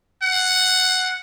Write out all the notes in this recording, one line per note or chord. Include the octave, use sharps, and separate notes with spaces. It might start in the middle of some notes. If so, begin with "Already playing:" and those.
F#5